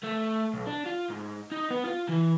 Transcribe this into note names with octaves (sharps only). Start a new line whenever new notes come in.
A3
B1
D4
F4
G#2
D#4
B3
F4
E3